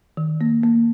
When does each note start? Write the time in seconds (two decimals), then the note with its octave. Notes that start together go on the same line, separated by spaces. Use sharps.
0.17 D#3
0.41 A#3
0.64 A#3